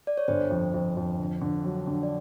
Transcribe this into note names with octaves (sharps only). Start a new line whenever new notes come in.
D5
C#5
G1 C5
F2
F2
F2
D3
D3
F#3
D3
D5